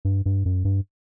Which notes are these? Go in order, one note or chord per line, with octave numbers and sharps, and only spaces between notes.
G2
G2
F#2
G2